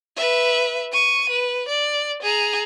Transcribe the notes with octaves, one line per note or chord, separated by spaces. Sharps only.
B4 E5
C#6 D#7
B4
D5
G#4 A#5